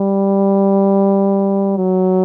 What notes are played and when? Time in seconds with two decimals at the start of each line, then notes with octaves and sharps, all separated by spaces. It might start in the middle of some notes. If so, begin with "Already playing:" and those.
Already playing: G3
1.77 F#3